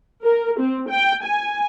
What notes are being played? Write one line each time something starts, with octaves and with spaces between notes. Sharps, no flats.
A#4
C4
G5
G#5